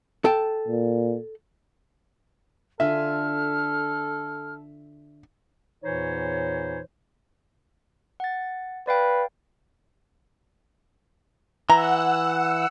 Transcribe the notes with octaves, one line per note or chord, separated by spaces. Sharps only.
A4 G5
A#2
D3 F4 A4 E5 G#5 F6
E2 A#2 E3 D#4 C5 C#5
F#5 A6
B4 D5 F5 G5
E3 F#5 A#5 E6